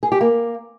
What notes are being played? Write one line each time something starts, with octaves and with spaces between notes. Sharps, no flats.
G#4
G4
A#3